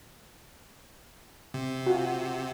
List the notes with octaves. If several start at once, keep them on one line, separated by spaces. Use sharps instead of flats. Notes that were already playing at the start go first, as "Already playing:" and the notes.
C3
F4 F#4